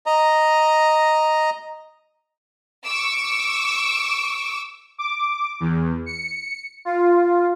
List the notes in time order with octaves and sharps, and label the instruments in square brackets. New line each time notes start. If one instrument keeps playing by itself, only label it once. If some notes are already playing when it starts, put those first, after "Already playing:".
[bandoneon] D#5 A#5
[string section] C#6 D6 E6
[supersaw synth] D6
E2
C#7
F4